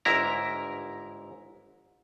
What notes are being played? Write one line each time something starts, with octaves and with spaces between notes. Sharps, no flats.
G1 G#2 E4 A#4 A#5